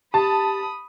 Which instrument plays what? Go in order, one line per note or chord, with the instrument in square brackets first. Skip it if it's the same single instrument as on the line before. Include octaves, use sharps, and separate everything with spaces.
[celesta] G4 [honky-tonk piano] A5 [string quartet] B5 D#6